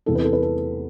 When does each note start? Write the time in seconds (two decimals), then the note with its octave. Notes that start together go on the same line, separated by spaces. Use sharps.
0.06 E2 C3 E3 A4
0.15 B4
0.24 A4
0.33 B4
0.42 A4